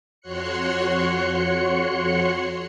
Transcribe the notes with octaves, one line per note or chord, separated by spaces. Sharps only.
F2 F#4 C#5 C6 F#6 C#7